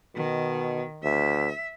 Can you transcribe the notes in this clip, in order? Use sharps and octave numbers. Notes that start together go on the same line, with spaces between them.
B2 D#3
D2 E5